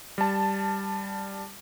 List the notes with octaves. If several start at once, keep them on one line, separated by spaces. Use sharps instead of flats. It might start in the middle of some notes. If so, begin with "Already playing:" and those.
G3 A5